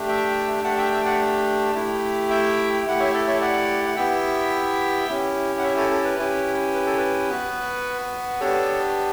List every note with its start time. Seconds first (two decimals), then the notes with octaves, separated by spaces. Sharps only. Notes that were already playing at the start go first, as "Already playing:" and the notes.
Already playing: A3 D4 G4
0.08 E5 G5
0.64 A3 D4 G4 F#5 A5
0.78 E5 G5
0.91 E5 G5
1.06 D5 F#5
1.75 A3 E4 G4
2.30 E5 G5
2.86 A3 E4 G4 F#5
3.00 C#5 E5
3.14 A4
3.27 C#5 E5
3.41 D5 F#5
3.86 F#5
3.97 B3 E4 G4 E5 G5
5.08 C#4 E4 G4
5.59 F#5
5.63 C#5 E5
5.77 A4 C#5
5.91 A4
6.05 B4
6.19 C#4 E4 G4
6.74 B4
6.86 A4
6.98 B4
7.29 B3 F#4
8.40 B3 D4 G4 A4 C#5